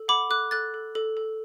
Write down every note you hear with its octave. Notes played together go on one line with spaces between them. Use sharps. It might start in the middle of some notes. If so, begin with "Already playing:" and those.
Already playing: A4
F#5 B5 D6
A4 D6 F#6
A4 F#6 A6
A4
A4
A4